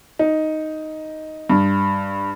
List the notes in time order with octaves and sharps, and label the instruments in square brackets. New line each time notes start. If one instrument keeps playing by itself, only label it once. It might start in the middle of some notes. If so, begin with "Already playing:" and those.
[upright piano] D#4
G2